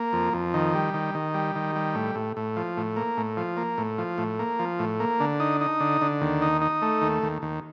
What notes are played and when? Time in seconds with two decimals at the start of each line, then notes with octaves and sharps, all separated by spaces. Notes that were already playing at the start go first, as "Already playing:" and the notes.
Already playing: A#3
0.13 F2
0.34 F2
0.54 D#3
0.74 G3
0.94 D#3
1.15 D#3
1.34 G3
1.55 D#3
1.75 G3
1.95 A2
2.15 A2
2.37 A2
2.57 F3
2.77 A2
2.96 A#3
3.17 A2
3.37 F3
3.57 A#3
3.78 A2
3.98 F3
4.18 A2
4.39 A#3
4.59 F3
4.79 A2
5.00 A#3
5.20 D3
5.40 D#4
5.61 D#4
5.80 D3
6.01 D3
6.21 D#2
6.42 D#4
6.61 D#4
6.82 A3
7.02 D#2
7.23 D#2
7.42 D#2